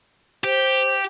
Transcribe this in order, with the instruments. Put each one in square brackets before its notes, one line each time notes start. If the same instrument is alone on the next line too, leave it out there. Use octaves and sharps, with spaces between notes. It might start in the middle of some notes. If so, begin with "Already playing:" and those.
[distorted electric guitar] G4 [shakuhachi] C5